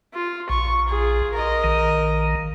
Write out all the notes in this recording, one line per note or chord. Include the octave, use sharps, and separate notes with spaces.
F4
A#1 C#6
F4 G#4
A#4 D#5
A#1 D#3